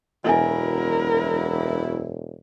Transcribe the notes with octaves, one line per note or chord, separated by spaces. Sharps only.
E1 F#2 B2 E4 A#4 D#5 E5 G#5